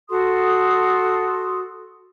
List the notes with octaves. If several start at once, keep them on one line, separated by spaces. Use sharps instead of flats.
F#4 A4 C6 D#6